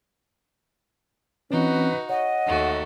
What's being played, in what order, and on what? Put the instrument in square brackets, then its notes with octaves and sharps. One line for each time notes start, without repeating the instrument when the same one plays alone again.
[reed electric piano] E3 C#4 [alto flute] C4 [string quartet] D#4 F#4 [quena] B4
[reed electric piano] C#5 [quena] D#5 [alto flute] F#5
[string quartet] D#2 A3 F#4